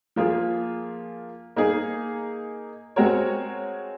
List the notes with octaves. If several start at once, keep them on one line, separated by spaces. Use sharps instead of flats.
F3 A#3 F4 G#4
A#3 D#4 G#4
G#3 C4 F#4 A#4 C#5